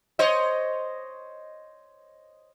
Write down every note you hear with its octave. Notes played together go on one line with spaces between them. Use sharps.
C5 C#5 D#5